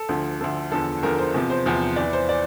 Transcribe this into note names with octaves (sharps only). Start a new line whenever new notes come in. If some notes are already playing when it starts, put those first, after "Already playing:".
Already playing: A4
D2 D3 F3
D2 D3 F3 A4
E2 D3 F3 A4
E2 D3 F3 A#4
C5
E2 C3 F3
C5
E2 C3 F3
E2 E3 D5
C5
D5